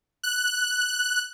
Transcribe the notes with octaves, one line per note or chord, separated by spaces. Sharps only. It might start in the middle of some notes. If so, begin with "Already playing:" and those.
F#6